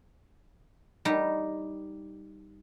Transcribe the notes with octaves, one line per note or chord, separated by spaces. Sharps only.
G3 D#4